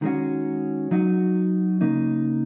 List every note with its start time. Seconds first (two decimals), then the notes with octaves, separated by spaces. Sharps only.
0.02 D#3 G#3 C#4 F#4
0.91 F#3 D#4 F#4
1.81 C#3 A#3 D#4